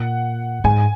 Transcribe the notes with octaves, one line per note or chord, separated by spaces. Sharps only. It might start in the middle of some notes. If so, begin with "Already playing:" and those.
Already playing: A#2 F#5
G#2 G#5